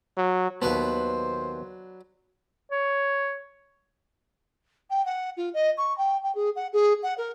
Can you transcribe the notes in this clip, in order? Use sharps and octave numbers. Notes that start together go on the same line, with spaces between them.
F#3
D#2 F#3 B3 D4 B4 C5 A5
C#5
G5
F#5
F4
D#5
C#6
G5
G5
G#4
F#5
G#4
F#5
A#4